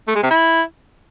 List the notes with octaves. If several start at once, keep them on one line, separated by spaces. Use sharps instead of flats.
A3
G#3
C3
E4